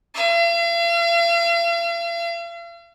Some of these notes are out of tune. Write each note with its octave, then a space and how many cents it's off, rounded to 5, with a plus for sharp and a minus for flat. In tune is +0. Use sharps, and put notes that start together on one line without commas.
F5 -45